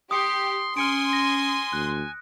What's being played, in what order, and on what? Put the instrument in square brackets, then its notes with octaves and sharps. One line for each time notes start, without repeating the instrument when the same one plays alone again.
[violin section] G4 [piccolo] C6 [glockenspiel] D#6 C#7
[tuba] C#4 [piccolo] G#5 [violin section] C6 D#6 [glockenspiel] F6 C#7 D7
[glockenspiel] A#6
[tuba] D2 [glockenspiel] F#6